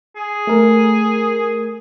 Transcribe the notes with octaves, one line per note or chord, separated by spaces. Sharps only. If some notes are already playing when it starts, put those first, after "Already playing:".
G#4
A3 A#4